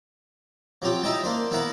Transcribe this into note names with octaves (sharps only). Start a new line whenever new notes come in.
F3 F#3 C4 F4 G4
D#4 E4 D#5 E5 G5 A5
A#3 D4 C5
B3 E4 C5 F5 F#5 A#5